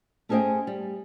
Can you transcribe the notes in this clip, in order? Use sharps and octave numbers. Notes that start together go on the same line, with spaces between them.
A3 C#4 G#4 C5 D#5 G5
G3